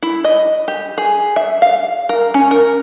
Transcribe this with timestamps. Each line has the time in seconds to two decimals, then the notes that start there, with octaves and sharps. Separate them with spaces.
0.03 E4
0.24 D#5
0.68 G4
0.98 G#4
1.36 E5
1.62 F5
2.09 A#4
2.34 C#4
2.51 A#4